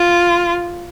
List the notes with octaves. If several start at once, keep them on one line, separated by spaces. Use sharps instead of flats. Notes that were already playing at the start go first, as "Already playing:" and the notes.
Already playing: F4